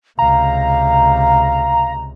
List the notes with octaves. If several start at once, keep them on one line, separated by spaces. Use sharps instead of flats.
C#2 C3 F5 A#5